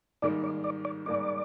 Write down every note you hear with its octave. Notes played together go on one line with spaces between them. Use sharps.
G#2 D#3 G3 A#3 D#4 D5
D5
D5
D5
G#2 D#3 G3 A#3 D#4 D5